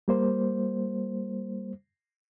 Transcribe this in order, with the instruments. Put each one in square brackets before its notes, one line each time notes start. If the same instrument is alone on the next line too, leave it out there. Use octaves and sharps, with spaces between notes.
[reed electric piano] G3 A#3 C5